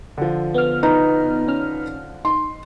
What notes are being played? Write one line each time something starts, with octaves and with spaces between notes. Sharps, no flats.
D3 F3
B3 F6
D#4 B4 A#5
C#4 F6
D#4 C6